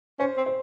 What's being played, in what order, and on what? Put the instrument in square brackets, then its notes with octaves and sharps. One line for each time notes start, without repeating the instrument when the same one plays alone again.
[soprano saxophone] C#4 [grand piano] C5
[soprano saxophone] C4
[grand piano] C5